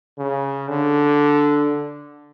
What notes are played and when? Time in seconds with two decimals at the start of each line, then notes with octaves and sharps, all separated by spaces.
0.18 C#3
0.69 D3